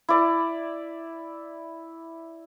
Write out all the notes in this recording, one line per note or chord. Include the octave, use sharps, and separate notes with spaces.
E4 D5